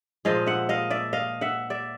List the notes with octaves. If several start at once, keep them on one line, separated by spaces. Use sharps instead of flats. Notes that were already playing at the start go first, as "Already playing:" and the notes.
A#2 F3 G#3 D#5 F5
E5 F#5
D#5 F5
D5 E5
D#5 F5
E5 F#5
D5 E5